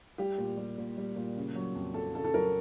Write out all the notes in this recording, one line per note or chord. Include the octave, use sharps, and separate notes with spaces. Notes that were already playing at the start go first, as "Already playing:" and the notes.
G3 G4
A#2
G3
A#2
G3
A#2
C#3
F#3
F2
F2 A4
C#3 A4
A4
F#3 A#4